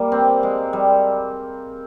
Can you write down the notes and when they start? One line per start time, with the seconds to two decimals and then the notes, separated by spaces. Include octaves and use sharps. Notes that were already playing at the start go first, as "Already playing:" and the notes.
Already playing: G3 A#3
0.12 C4
0.43 G#3
0.73 G3